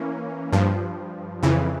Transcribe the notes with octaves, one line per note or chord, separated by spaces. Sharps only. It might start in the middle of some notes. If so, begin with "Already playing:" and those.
Already playing: E3 A#3 C#4
G2 F3
F2 C#3 E3